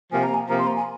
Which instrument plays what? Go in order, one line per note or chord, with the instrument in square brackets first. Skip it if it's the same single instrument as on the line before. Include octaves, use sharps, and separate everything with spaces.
[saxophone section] C3 F3 A#3 [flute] G#5
[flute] A#5
G#5
[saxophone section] C3 F3 A#3 [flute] A#5
[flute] C6
A#5
G#5